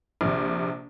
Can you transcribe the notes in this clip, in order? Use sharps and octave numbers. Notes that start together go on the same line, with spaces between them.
A#1 C3